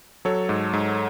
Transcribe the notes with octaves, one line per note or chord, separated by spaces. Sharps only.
F#3 A4 C#5
G#2
G#2